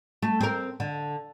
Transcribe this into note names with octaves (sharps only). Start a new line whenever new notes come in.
A3
C4 A#4
D3